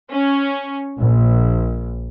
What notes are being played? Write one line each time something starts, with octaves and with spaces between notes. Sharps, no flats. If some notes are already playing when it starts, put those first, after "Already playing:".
C#4
A#1